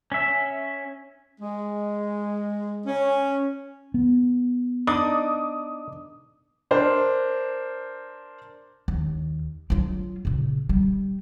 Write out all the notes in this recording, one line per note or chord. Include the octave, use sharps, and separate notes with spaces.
C#4 E5
G#3
C#4
B3
D4 D#4 D6 D#6
D4 A#4 C5
D#2
F#3 F4
A#2 C#3
G3